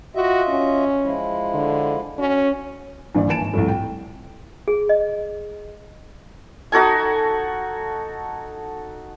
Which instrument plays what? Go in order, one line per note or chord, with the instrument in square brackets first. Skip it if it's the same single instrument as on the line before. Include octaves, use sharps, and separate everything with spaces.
[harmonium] F4 D#5 E5 [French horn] F#4
[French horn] C#4
[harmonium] F3 G#3 E4
[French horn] D3
[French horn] C#4 [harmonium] F#4
[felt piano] A#1 G2 E3 D5
E3 A#3 G#5 A5 D7 E7
G#1
C2 F2 A2
G5
[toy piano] G#4
D#5
[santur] D#4 F#4 A4 G#5